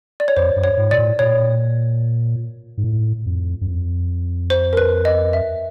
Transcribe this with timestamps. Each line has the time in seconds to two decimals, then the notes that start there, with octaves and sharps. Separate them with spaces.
0.20 D5
0.28 C#5
0.36 F2 C5
0.56 F#2
0.64 C#5
0.77 G#2
0.91 A#2 D5
0.98 A2
1.19 A#2 C#5
2.77 G#2
2.84 A2
3.26 F2
3.61 F#2
3.67 F2
4.50 C5
4.73 A#4
4.77 B4
5.05 D#5
5.33 E5